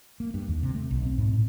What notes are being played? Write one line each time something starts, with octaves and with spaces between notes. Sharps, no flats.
A#3
G2
D#2
C3
A3
B1
C4
G#2
A2